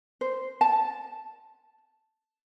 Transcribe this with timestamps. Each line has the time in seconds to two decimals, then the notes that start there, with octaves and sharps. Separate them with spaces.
0.21 C5
0.61 A5